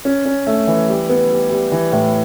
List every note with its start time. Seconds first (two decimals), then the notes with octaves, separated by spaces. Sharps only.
0.05 C#4
0.25 C#4
0.47 A3
0.67 E3
0.88 G3
1.09 B3
1.30 G3
1.50 G3
1.72 E3
1.92 A2